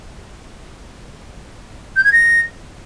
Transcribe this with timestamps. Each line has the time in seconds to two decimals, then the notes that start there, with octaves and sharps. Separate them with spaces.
1.96 G6
2.04 G#6
2.12 A#6